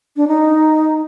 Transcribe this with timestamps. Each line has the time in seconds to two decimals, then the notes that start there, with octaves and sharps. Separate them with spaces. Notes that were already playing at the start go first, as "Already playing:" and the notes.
0.17 D4
0.28 D#4